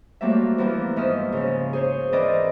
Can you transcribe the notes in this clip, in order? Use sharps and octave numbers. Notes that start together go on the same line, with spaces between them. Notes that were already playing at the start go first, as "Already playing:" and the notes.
F#3 G3 A3 A#3 C4 E5
E3 F3 G3 A#3 B3
G#2 F3 E5 D#6 F6
C#3 F3
G#4 C5 C#5
E3 C4 E4 A#4 D5 D#5